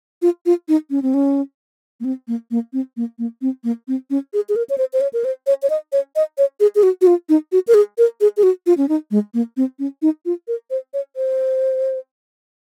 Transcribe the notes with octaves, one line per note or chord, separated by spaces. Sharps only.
F4
F4
D#4
C#4
C4
C#4
A#3
C4
A#3
A#3
C4
A#3
A#3
C4
A#3
C4
C#4
G#4
G#4
A#4
C#5
C5
C5
C#5
A#4
C5
C#5
C#5
D#5
C#5
D#5
C#5
G#4
G#4
F#4
F#4
F4
D#4
F#4
A#4
G#4
A#4
G#4
G#4
F#4
F4
C#4
D#4
G#3
A#3
C4
C#4
D#4
F4
A#4
C5
C#5
C5